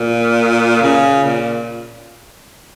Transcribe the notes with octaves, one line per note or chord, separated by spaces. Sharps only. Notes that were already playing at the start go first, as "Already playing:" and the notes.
Already playing: A#2
C#3
A#2